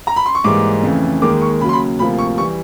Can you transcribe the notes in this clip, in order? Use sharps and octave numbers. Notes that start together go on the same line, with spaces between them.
A#5
B5
C6
C#6
G#2 E3 G3 A#3 D6
F2 C#3 E3 A3
D#2 D#3 G#3 D6
C#6
D#2 C#3 F#3 B5
C6
B5
D2 C3 F3 A#3 B5
C#6
E3 G3 C#6